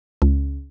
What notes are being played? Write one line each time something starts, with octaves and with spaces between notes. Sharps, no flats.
C#2